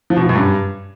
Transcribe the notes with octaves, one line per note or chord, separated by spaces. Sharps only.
F3
B2
F3
F#2
G2